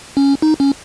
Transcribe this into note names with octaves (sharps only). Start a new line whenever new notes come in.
C#4
D#4
C#4